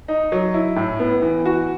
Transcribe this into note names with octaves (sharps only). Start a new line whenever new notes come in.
D#4
F#3
E4
A2
B3
E3
F#4